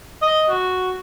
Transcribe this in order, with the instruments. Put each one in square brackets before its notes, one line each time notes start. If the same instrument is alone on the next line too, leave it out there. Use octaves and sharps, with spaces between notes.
[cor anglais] D#5
F#4